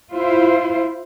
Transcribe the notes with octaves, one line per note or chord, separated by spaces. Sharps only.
E4 F4 C5